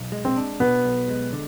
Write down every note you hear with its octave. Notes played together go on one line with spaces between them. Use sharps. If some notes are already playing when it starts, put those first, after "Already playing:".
Already playing: B1
G#3
C4
D4
B2 B3
B1
G#3
D3